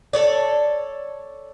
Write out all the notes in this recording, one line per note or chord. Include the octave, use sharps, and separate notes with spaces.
A4 C#5 D5